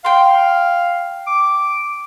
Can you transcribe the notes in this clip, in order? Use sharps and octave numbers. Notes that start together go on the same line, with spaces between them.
F5 G5 C6
D6